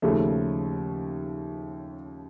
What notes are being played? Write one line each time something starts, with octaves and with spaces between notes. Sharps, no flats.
D#2 C#3 F3 A3